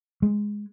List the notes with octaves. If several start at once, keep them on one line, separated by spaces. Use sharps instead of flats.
G#3